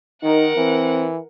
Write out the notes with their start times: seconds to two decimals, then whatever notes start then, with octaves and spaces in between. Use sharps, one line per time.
0.23 D#3 D#4 A#4 F#5
0.57 E3 C4